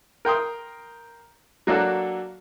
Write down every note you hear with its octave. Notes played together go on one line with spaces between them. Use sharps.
A#4 G5 C6 D#6
F#3 A#3 D4 F#4 A4